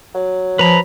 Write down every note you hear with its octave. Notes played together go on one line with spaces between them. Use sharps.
F#3
F3 B4 A#5 B5